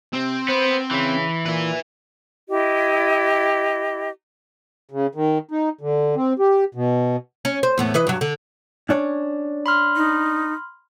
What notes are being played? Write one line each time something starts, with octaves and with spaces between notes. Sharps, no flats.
C3 C4
B3 C5
C#3 E3
A#2 B4 E5
E4 G4 D#5
C#3
D#3
D#4
D3
C4
G4
B2
C#4
C5
E2 A2 B3
E3 B4 D#5
G2 F#3
D3
C#4 D4 C#5
B5 C6 F6
D#4